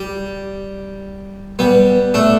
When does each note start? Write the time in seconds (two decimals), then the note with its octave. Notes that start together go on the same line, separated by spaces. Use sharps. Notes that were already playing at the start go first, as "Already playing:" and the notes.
Already playing: G3
1.59 G3 B3
2.14 A3 D4